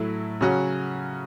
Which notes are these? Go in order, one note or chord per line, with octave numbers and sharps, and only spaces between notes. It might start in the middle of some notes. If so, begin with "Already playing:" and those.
Already playing: A2 F#3 A3 E4
C#3 F#3 C#4 F#4